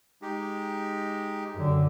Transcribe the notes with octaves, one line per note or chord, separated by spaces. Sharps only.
G#3 D#4 G4
F#2 D3